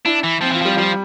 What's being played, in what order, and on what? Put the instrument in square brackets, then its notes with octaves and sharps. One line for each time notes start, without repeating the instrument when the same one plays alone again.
[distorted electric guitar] D4 [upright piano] E4
[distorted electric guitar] E3
[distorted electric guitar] F3 [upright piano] C4
[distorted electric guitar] E3 [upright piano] F4
[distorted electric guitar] F3 [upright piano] G3
[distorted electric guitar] F3 [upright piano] G3